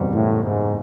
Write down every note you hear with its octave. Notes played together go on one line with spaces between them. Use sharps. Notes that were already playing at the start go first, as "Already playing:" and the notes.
Already playing: F#1 E2 B2 G3 C4
A2
G#2